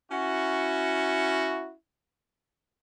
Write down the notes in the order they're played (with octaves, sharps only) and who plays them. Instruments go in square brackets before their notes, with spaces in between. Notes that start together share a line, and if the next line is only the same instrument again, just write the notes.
[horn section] C#4 E4 F#4